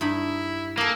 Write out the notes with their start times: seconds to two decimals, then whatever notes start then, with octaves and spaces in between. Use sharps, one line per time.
0.01 G2 D#4 E4 B5
0.77 A#3 G#4 A4